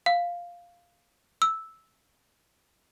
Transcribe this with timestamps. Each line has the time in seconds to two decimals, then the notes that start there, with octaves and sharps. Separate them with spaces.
0.06 F5
1.42 E6